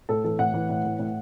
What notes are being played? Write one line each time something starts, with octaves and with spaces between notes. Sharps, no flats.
A2 A4
E3 A4
A2 F#5
E3
A2
E3
A2